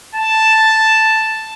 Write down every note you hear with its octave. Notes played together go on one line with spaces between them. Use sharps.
A5